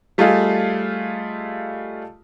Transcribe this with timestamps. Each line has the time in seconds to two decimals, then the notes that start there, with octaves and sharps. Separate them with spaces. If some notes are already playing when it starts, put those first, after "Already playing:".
0.18 G3 A3 F4 G#4 D#5 F5